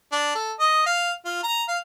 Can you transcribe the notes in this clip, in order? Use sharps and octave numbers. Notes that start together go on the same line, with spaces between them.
D4
A4
D#5
F5
F4
A#5
F5